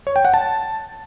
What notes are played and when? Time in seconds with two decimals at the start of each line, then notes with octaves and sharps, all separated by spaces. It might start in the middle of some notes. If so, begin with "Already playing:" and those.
0.07 C#5
0.16 G5
0.25 F#5
0.34 A5